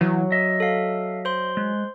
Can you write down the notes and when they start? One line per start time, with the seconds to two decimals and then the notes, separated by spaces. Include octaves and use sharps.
0.01 E3 F#3
0.32 D#5 E5
0.60 A4 F5
1.25 C5 C6
1.57 G#3